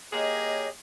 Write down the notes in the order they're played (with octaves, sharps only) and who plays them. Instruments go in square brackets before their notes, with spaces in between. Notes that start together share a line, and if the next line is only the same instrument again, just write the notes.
[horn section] A#3 G4 G#4 [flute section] C#5 D#5